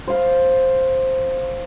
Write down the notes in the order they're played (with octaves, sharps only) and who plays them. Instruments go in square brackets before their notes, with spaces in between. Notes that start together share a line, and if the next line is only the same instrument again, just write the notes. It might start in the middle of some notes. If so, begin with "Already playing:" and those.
[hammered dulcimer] C5 F5